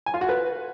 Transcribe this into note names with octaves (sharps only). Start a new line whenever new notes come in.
G#5
F4
F#4
B4